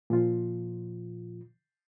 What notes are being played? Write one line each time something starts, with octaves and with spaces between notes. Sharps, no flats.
A#2 F3 F4